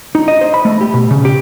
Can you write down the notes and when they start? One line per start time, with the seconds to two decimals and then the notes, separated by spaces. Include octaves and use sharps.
0.15 D#4
0.28 D#5
0.41 C5
0.54 B5
0.65 A3
0.81 G4
0.94 B2
1.11 C#3
1.25 G4